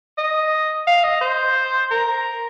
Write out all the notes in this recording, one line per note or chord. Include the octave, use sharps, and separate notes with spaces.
D#5
F5
D#5
C5
A#4